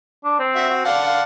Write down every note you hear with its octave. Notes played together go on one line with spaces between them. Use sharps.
D4
C4
F#4 E5
F#4
D5 F5 F#5 A5
F5